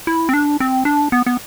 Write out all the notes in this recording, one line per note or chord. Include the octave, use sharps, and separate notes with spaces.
E4
C4
D4
C4
D4
B3
B3